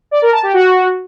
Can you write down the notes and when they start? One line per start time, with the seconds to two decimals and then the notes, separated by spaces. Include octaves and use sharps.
0.11 D5
0.22 A#4
0.32 A5
0.43 G4
0.54 F#4